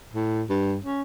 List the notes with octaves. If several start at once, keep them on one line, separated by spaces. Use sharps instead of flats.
A2
G2
C#4